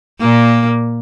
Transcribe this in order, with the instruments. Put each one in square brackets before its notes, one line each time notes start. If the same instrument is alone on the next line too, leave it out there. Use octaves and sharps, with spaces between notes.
[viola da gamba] A#2 A#3